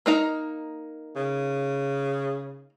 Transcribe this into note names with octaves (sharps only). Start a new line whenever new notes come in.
A#3 D#4 A#5
C#3